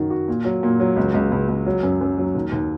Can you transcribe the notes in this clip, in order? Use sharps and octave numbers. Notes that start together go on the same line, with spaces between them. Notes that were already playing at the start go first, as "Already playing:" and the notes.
Already playing: F#2 D#3 F#4
F#4
A#2
F#3
A#2
F#3
C#2
C#2
C#2
C#2
F#3
F#2
F#2
F#3
D#2
D#2